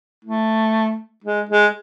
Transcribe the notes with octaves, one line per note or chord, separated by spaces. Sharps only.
A3
G#3
G#3